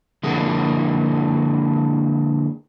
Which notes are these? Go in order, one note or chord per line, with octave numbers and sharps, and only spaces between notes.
D3 F3 G#3 A#3 E4 G#4